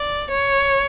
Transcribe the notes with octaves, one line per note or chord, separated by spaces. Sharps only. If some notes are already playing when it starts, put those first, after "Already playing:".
Already playing: D5
C#5